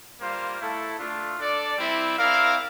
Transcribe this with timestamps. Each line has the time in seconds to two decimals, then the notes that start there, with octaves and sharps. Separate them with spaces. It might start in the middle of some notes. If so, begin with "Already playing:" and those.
0.20 G3 A#3 F4 C5 F5
0.60 A3 E4 A4
1.00 A3 D4 F4
1.39 D4 A4 D5
1.78 G3 C4 E4
2.18 C4 E4 A#4 D5 F5